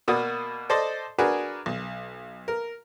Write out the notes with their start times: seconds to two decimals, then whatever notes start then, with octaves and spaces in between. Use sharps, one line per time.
0.08 B2 A#3 F#4 D5 D#6
0.70 A4 C5 D5 D#5 C6
1.18 D4 F#4 G#4 A#4 B4
1.66 B1
2.48 A#4